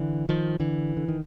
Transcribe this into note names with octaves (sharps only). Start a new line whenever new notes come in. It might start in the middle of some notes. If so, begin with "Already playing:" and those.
Already playing: D3 E3
D#3 F3
D3 E3
D3
D#3